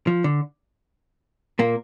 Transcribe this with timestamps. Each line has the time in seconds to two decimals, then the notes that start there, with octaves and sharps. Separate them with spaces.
0.07 F3
0.24 D3
1.59 A#2 A#3